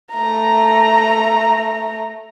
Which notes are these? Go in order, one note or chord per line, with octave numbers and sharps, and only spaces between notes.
A3 A#5